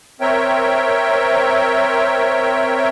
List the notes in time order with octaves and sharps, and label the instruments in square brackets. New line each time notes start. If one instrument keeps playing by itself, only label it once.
[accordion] C4 A#4 C#5 E5 G5